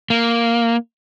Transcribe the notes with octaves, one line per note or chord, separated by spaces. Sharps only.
A#3